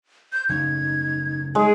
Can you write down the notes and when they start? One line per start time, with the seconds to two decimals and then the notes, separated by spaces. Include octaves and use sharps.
0.33 G6
0.50 C#3 F#3 A3 D#4 G#6
1.55 G#3 D#4 G#4